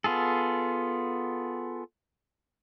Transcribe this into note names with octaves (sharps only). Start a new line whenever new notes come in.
B3 F4 G#4 A4